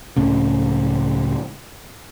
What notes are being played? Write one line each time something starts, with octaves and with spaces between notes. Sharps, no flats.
C#2 A2 C#3